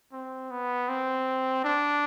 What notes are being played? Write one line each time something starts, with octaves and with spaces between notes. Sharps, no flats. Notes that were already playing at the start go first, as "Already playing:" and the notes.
C4
B3
C4
D4